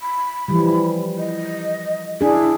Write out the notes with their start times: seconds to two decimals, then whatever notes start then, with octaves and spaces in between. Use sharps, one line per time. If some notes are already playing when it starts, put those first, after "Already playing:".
0.02 B5
0.48 E3 F3 G3
1.18 D#5
2.21 D4 E4 G#4